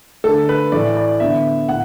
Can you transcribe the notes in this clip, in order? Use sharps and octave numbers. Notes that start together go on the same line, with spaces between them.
D3 A3 A4
B4
A2 E3 A3 D5
D5
D3 B3 E5
A2 F#5